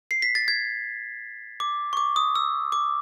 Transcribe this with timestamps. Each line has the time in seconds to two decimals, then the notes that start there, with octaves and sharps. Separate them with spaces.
0.11 C7
0.22 B6
0.35 A6
0.48 G#6
1.60 D6
1.93 C#6
1.97 D6
2.16 D#6
2.35 E6
2.72 D6